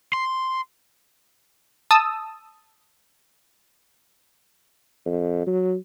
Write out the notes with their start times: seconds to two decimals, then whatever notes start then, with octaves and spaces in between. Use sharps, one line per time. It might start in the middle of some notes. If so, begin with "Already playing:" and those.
0.13 C6
1.91 A5 D#6 E6
5.06 F2
5.47 F#3